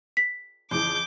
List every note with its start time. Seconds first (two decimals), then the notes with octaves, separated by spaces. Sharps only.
0.17 B6
0.71 F2 C#3 E3 D6 G6